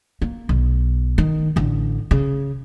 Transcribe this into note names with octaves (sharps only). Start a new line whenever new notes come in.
A#3
B1
D#3
A1 D3
C#3